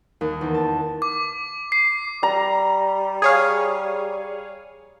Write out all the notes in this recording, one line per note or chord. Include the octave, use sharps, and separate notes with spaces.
D#2
E2
A5
D6
C7
G3 A#5
G#4 C#5 F5